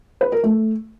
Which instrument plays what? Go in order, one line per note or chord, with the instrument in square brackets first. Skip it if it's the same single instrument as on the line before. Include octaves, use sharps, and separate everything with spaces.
[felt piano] B4
A#4
A3